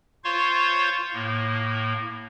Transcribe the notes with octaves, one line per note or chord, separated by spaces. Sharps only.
F4 C5 C#5 F5 C6 C#6
A2 A#3